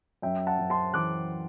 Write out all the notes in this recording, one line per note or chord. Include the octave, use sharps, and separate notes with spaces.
F#2 E5 G5
F#5 A5
F#2
A5 C6
E3 D6 F#6